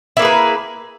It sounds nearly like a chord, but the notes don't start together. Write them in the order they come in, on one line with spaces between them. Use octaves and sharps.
E4 A#3 G#4 B4